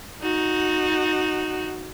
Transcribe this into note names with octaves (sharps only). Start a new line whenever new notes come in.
D#4 F#4